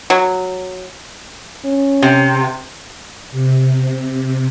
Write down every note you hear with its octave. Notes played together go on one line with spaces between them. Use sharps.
F#3
C#4
C3
C3